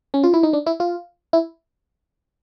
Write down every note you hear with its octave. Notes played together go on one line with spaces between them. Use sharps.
C#4
F4
E4
D#4
D4
E4
F4
E4